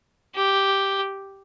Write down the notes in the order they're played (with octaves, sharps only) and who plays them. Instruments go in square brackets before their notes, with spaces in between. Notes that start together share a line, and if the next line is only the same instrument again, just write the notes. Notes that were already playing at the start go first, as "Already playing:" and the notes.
[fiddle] G4